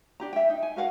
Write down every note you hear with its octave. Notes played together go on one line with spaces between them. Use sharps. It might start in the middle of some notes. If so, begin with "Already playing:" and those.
D4 G4 A#5
E5 G5
D#4
G#5
F#4 A#4 F5 F#5